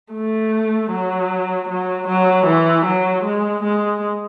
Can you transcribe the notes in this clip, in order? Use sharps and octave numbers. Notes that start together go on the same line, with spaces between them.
A3
F#3
F#3
F#3
E3
F#3
G#3
G#3